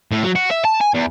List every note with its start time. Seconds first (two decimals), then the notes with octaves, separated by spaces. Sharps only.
0.12 A2
0.23 F#3
0.35 F#4
0.51 E5
0.65 A5
0.81 G#5
0.94 E2